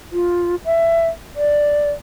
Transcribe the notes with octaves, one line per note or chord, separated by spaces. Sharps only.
F4
E5
D5